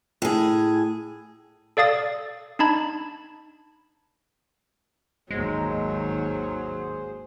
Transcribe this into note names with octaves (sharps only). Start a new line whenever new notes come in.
A2 G#4
A4 D5 F5 D#6 A6
D4 D#4 A5 B5 G#6
G#1 D#2 F#3 G#3 G#4 C5